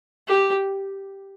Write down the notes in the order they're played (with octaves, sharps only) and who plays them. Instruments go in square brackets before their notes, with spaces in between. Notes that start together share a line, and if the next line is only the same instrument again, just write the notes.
[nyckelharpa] G4